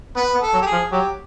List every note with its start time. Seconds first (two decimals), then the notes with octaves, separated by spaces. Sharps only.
0.16 B3 B4
0.34 B3
0.41 A4
0.53 F#3
0.62 G4
0.66 G#4
0.72 F3
0.92 F#3 G4